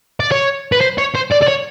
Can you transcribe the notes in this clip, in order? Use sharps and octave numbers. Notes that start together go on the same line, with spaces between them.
D5
C#5
B4
C5
C#5
C5
D5
D5
C#5